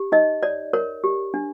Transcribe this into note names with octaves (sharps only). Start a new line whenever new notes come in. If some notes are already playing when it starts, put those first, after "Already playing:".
Already playing: G4
D#4 D#5
C#5 D5
A#4 C#5
G4
D4